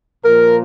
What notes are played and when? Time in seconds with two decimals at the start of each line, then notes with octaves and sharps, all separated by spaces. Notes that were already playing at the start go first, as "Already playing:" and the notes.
0.25 A#2 F3 A#4